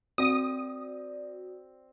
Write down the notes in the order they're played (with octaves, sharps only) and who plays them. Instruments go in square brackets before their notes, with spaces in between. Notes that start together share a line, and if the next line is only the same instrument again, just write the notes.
[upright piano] C4 [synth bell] F#4 D5 [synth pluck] D#6